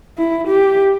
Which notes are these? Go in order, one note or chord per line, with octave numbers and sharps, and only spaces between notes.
E4
G4